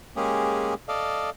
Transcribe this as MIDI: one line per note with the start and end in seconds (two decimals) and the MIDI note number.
0.16 0.74 56
0.16 0.74 58
0.16 0.74 61
0.16 0.74 67
0.16 0.74 68
0.88 1.30 69
0.88 1.30 74
0.88 1.30 75
0.88 1.30 77